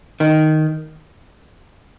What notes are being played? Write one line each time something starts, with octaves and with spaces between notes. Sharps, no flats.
D#3